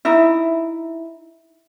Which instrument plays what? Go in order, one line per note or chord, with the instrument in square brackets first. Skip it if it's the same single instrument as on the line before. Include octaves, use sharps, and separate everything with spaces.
[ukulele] D#4 E4 [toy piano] E5